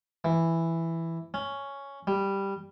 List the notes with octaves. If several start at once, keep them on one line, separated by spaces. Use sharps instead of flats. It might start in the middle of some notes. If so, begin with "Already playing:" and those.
E3
C#4
G3